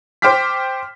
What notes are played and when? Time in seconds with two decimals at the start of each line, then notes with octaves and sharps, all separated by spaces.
0.22 C5 G5 D6 F6 B6